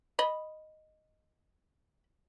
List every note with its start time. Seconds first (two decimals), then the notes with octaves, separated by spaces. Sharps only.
0.19 D#5 B5